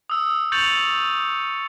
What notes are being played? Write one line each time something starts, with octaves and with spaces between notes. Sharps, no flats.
D#6 E6
C#6 G6 A6 C#7 F7 F#7